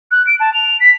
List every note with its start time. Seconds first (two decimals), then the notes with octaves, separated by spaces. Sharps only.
0.11 F#6
0.27 D7
0.40 A5
0.54 F7
0.80 B6